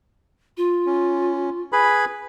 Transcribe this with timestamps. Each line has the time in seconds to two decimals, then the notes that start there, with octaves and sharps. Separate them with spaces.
0.57 F4
0.86 C#4
1.72 G#4 B4 B5